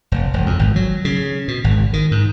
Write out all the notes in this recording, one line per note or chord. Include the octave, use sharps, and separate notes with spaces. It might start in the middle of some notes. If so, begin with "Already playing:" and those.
F1
E1
F2
G#1
F#3
C#3
B2
G#1
D#3
G#2